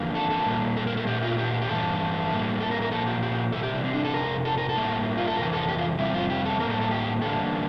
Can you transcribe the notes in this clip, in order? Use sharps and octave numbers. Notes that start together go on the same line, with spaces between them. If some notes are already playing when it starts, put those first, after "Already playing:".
Already playing: E2 D3 F3 A#3
A4
A4
A#2 G3 A#3
A4
A#4
A4
A#2 A3 G4
F4
G4
G4
G2 E3 A3 A4
A2 G3 A#3
A4
A#4
A#4
A#2 F3 A#3 A4
G4
G4
C3 E3 G3 A4
G4
E4
C4
D4
A4
F2 C3 A#4
A4
A#4
A4
A2 G3 A#3
F4
A4
F2 C3 E3 A#4
A4
G4
F4
F2 C3 G3 E4
F4
G4
A4
A2 G3 A#3 A#4
A4
A4
G4
E2 D3 G3 A#3 A4